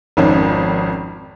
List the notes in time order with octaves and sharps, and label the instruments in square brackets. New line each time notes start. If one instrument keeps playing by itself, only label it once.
[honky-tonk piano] G#1 F2 D#3 C#4